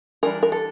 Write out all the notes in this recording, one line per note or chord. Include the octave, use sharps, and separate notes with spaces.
E3 G3 D4 A#4
A#4
A4